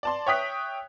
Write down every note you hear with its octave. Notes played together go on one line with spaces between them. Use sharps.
D5 A5 C6
C#5 E5 G5 D#6 F#6 B6